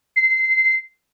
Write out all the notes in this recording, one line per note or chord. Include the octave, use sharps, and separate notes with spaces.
C7